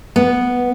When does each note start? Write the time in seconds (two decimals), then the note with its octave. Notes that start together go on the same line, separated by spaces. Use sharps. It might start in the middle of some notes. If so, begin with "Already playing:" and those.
0.16 B3